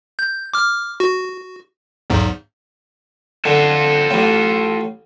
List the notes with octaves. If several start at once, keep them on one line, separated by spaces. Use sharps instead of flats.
G6
D6 F6
F#4
B1 E2 G#2
D3 F4 A4
A1 A2